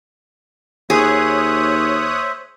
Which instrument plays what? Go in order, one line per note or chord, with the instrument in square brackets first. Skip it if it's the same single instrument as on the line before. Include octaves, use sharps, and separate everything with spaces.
[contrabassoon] D#2 [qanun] G#4 [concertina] C5 E5 [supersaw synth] C#5 D#6 F#6